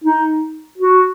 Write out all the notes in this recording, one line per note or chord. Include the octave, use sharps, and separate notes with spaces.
D#4
F#4